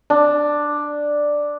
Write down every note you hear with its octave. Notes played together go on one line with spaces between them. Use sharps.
D4